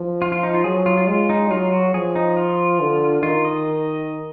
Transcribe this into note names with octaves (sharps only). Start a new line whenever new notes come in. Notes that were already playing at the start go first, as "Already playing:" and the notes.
Already playing: F3
F4
F4
D#4
F4
F#3 G#4
F4
F4
G#3 F4
D#4
F#3 F4
F#4
F3 G#4
D#4
F4
D3
D#3 F4
D#5